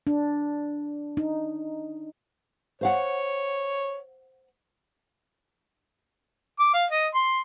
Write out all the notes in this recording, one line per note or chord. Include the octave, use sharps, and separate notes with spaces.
D4
D#4
C5 C#5 F5 F#5
D6
F5
D#5
C6